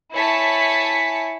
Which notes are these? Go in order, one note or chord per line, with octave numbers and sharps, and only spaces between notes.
E4 C#5 G#5 A5 B6 C#7